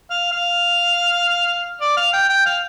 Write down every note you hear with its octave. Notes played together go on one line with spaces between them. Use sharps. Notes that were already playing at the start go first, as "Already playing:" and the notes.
F5
F5
D5
F5
G5
G5
F5